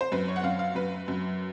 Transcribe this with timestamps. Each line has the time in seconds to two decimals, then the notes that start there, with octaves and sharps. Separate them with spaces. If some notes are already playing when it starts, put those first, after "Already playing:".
0.01 C5
0.12 F#2 B4
0.28 C#5
0.36 F#5
0.43 F#2 F5
0.59 F5
0.75 F#2 B4
1.08 F#2